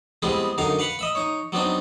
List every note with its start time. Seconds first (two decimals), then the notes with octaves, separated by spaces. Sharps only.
0.22 G3 G#3 B3 C4 E4 G#4
0.58 F#2 D3 D#4 A#4 F5
0.79 B4 F5 F#5 B5
0.99 D#5 E5 B5
1.15 D#4 C#5
1.52 F#3 B3 C4 D4 D#4